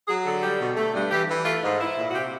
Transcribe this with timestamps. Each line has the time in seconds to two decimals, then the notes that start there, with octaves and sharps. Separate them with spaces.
0.08 F#3 G#4
0.25 D3 A4
0.42 G3 G4
0.60 B2
0.76 A3
0.94 G2
1.11 E3 G4
1.28 E3
1.45 A3 F4
1.62 G#2
1.80 E4
1.97 A#2
2.09 F#4
2.14 C3 G4